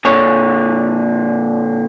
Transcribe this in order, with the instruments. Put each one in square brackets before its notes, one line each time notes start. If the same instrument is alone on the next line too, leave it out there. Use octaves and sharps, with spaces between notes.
[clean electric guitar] A#2 D3 C#5